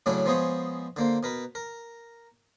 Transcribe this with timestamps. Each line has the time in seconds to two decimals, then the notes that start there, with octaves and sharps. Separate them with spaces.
0.06 A2 C#3 F#3 C#4 D4 E4
0.26 F3 G#3 B3 G#4 C5 C#5
0.96 D3 A#3 C5
1.23 B2 A#4 B4
1.55 A#4